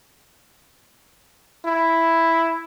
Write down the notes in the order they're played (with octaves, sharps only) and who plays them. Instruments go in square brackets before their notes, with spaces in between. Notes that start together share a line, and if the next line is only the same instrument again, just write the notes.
[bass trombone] E4